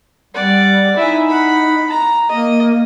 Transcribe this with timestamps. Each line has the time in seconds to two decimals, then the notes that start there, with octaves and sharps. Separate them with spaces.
0.34 G3 D5 F#5
0.97 D#4 E4 G#5
1.28 F#5 B5
1.90 A#5
2.30 A#3 D#5